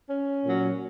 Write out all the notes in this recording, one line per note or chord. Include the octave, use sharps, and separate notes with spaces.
C#4
A#2 F#3